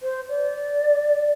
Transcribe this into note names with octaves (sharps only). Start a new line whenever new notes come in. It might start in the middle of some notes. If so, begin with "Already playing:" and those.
C5
D5